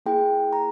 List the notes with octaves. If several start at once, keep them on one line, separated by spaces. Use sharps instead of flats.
A#3 E4 G#4 G5
A#5